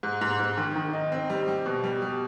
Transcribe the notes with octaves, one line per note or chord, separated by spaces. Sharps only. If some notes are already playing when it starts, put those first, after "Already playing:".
G#2
G#2
G#2
D#3
D#3
D#4
C4
G3
G3
B2
G3
G3